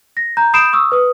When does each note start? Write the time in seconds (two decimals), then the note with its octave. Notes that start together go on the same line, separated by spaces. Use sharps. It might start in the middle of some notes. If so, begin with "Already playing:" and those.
0.17 A#6
0.37 A#5 G6
0.54 B5 D#6 G6 C7 D7 E7
0.73 C#6 D#6 E6
0.92 B4 D#6